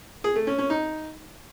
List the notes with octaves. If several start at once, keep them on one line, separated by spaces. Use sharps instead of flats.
G#4
A3
C#4
C#4
D#4